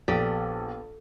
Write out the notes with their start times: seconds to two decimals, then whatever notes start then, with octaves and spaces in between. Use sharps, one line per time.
0.08 A#1 B3 G4 A4 D5